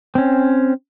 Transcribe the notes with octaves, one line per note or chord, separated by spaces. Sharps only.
C4 C#4